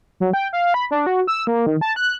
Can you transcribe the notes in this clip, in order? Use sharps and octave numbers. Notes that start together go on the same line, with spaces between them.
F#3
G5
F5
B5
D4
F#4
E6
A#3
D#3
A5
F#6